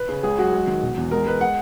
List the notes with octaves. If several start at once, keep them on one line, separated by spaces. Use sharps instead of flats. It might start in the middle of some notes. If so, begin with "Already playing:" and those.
Already playing: B4
C#3
C#2 G#4
F#3 F#4
G#3
D#3
E1
E2
G#3 A#4
G#3 B4
F#5